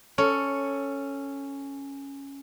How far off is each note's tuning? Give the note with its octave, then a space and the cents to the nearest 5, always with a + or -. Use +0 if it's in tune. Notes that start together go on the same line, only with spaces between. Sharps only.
C#4 +0 A4 +10